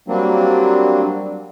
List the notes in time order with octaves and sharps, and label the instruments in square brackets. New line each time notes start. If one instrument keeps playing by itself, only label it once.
[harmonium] F#3 G3 A#3 C4 D4